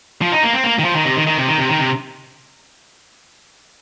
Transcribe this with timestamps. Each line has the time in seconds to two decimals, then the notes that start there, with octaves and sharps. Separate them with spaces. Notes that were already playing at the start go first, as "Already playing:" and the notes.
0.22 F3
0.32 D#4
0.43 A#3
0.54 C4
0.64 A#3
0.79 D#3
0.84 F3
0.96 D#3
1.05 C3
1.16 D#3
1.27 D#3
1.38 C3
1.48 D#3
1.58 C3
1.69 D#3
1.79 C3